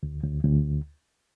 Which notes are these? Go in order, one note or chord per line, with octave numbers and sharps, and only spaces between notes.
D2
D2
D2